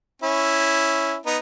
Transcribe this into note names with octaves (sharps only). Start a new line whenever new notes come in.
C#4 E4
B3 D#4